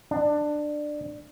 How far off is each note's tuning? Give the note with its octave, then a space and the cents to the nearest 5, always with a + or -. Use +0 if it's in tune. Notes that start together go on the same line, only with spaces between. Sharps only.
D4 +20